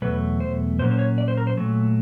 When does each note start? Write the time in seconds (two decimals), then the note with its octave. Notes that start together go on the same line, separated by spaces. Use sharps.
0.02 E2 B2 F#3 A3 B4
0.40 C5
0.79 A#2 F#3 A#3 C#4 C5
0.91 C5
0.99 C#5
1.18 D5
1.28 C5
1.37 A#4
1.47 C5
1.57 A#2 F#3 A3